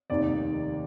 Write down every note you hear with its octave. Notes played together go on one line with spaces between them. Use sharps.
F1 D#2 D#3 D5